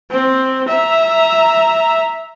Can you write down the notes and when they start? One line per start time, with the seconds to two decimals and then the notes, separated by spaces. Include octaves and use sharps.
0.11 C4
0.69 E5 A#5